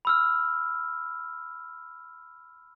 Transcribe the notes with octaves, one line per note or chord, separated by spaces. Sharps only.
B5 E6 F6